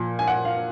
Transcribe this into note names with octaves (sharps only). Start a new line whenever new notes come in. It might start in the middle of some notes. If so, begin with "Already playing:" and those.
Already playing: A#2 F3
G#5
F#5
F5